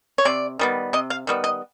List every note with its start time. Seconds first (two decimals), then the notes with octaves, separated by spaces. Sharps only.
0.18 C#5
0.25 C3 D5
0.59 D#3 G3 B3
0.93 C3 D#5
1.10 F5
1.27 D#3 G3 B3
1.44 D#5